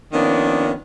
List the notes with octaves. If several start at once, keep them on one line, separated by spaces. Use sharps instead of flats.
D#3 F3 A#3 B3 C#4 D4